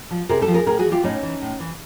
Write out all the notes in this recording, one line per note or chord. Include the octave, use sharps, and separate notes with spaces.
F3
C3 G#4 A#4
G4 A4
F3
G#4 A#4
A2 G#4 A#4
F#4 G#4
E3
F4 G4
A2 C#4 D#4
E3
A2
E3